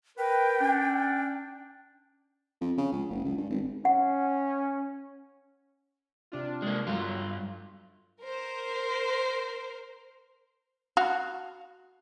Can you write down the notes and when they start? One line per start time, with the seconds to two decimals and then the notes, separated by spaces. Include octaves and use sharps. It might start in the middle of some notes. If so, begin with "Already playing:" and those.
0.18 A#4 B4 G5
0.60 C#4 D4
2.61 F2
2.78 C#3
2.92 C#2
3.10 F#1
3.25 C#2
3.37 G2
3.50 G#1
3.85 C#4 F#5
6.32 C3 D4 F4
6.62 G#3 A#3
6.87 G2 F#3 F4
8.22 A#4 C5
10.97 F#4 F5